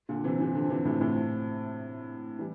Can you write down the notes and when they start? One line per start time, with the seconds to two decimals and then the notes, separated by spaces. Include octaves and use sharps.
0.09 A#2 D3
0.24 C3 E3
0.40 C3 E3
0.55 D3 F3
0.70 C3 E3
0.85 A2 C3
1.01 A2 C3
2.39 E3 G3